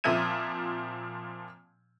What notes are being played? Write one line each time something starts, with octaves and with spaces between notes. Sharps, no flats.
A#2 F3 C4 E5 G#6 D#7